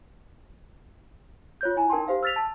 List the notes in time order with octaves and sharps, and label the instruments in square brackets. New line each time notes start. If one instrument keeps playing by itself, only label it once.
[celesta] F4 C#5 G6
E4 G#5 A#5
D#4 A#4 G5 A5 C6
G4 C5 F5
E6 F6 A6 B6 F7
A5